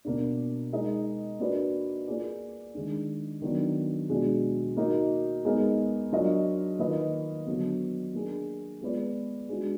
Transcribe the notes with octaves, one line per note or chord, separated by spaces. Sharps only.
B2 A#3 D4
G#3 D#4 A#4 D#5
A#3 D4 F#4 B4 D5
A#3 F4 G#4 D5
D#3 G#3 D4
D#3 F#3 B3 D4
B2 G#3 D4 F#4
A#3 D#4 F#4 A#4
G#3 B3 D#4 A#4
F#3 D4 F4 A#4 D#5
D#3 A#3 F4 B4 D#5
D3 F#3 B3
A#3 D4 G#4
G#3 B3 F4 B4 D5
G#3 D4 F#4